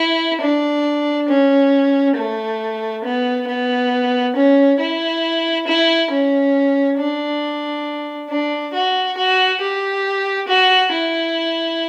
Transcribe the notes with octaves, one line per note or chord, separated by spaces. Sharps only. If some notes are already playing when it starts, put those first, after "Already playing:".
Already playing: E4
D4
C#4
A3
B3
B3
C#4
E4
E4
C#4
D4
D4
F#4
F#4
G4
F#4
E4